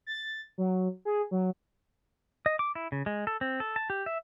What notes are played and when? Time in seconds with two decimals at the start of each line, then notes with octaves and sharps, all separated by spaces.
0.07 A6
0.58 F#3
1.05 G#4
1.31 F#3
2.46 D#5
2.59 D6
2.75 E4
2.92 C#3
3.06 G#3
3.27 A4
3.41 C4
3.60 A4
3.76 A5
3.90 G4
4.06 E5